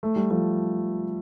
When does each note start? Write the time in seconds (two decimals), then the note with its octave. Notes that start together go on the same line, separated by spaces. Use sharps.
0.03 A3
0.16 G3
0.30 F3 A3